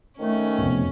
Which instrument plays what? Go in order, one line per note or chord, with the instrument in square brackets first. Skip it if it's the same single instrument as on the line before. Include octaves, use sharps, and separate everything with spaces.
[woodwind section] F2 D#3 A3 [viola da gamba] C#4
[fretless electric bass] F1 B2